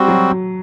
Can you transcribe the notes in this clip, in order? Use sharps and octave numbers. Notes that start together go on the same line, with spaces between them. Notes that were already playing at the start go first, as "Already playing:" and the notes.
Already playing: G3 C4 F#4
F#3